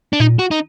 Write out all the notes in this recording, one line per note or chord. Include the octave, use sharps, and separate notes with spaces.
D4
A#2 D#4
F#4
D#4